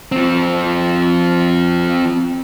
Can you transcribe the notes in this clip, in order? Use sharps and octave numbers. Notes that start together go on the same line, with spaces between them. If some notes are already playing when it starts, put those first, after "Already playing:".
F3 C4